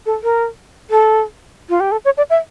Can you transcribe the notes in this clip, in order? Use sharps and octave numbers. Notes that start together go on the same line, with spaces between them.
A4
A#4
A4
F4
G4
A4
C#5
D5
E5